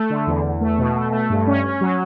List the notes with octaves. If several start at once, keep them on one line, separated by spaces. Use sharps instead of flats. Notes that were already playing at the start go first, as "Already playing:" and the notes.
Already playing: A3
D3
E2
E2
A3
B2
A3
A3
G2
C#4
C#4
F#3